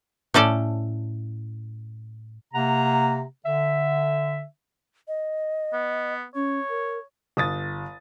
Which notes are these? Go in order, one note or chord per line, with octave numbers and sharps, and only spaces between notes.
A2 C#4 A4 D5
C3 A#3 F#5 A#5
D3 E5
D#5
B3
C#4 C#5
A#4
G1 D#6 A6